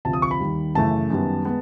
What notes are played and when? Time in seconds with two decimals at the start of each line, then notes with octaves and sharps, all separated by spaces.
0.05 D2 C3 F3 A5
0.13 D#6
0.22 C#6
0.31 B5
0.40 D#2 D#3 G3
0.75 F#2 C#3 E3 A3 A5
1.10 F#2 D#3 G3 B3
1.45 G#3 B3